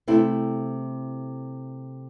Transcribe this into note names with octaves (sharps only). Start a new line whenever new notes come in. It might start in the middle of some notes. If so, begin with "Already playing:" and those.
C3 A3 C4 E4